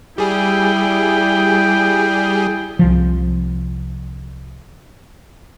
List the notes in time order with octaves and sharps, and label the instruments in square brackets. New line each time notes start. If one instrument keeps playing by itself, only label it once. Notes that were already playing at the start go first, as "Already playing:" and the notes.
[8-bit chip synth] G3 G#4 [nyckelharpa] E4 G5
[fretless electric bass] C2 C3 F3